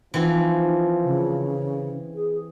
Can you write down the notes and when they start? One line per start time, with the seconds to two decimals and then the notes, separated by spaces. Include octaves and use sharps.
0.14 E3 F3 C4 D#4
1.04 C#3
2.15 G#4